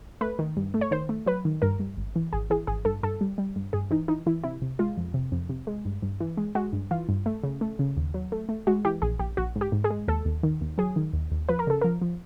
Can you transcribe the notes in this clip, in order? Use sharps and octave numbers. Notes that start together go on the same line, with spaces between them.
A3 B4
D#3
G2
A3
C#5
D#3 C5
A3
F#3 B4
D#3
G2 A#4
G2
G#1
E3
G#1 G#4
E3 G#4
G#1 G#4
G2 A4
G2 A4
G3
G3
G2
G2 G#4
E3 D#4
E3 D#4
E3 E4
C3 E4
C3
G#3 F4
F2
C3
F2
C3
G#3
G2
G2
E3
G#3
G#3 F#4
G2
E3 F4
G2
A3
C#3
A3
C#3
D#2
F#3
A3
A3
G#3 F#4
E3 G4
A#1 G#4
A#1 G4
A#1 F#4
G#2
G4
G#2
G#4
G#3
D#2 A4
D#2
D#3
D#2
F#3 G#4
D#3
D#2
D#2
F3 B4
A#4
C#3 A4
F3 A#4
F3